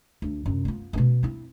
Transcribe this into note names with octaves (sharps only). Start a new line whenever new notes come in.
D2
F#2 C3
B3 F4
D#1 B2
C4 E4